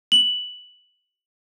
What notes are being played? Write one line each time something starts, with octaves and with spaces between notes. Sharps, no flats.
F#7